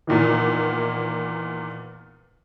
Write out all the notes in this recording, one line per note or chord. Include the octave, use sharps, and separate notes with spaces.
E2 A#2 D#3 E3